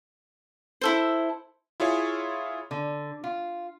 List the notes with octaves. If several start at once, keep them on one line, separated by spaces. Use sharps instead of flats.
E4 A4 C5
E4 F4 G#4 C#5
D3
F4